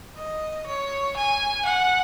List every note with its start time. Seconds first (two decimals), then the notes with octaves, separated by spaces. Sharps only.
0.17 D#5
0.66 C#5
1.17 G#5
1.66 F#5